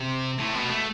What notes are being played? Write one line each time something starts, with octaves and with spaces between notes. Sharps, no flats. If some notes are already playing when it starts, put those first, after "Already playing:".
Already playing: C3
A2
B2
A3